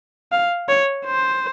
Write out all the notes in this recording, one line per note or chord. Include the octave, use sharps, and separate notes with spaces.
F5
C#5
C5